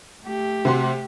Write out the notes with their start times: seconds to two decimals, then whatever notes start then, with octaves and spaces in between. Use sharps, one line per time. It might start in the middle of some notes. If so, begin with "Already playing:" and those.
0.23 A3 G4
0.65 C3 F#4 C6